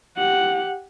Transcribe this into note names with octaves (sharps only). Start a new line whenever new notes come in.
G4 F#5